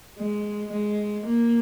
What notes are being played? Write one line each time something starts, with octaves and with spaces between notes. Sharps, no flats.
G#3
G#3
A#3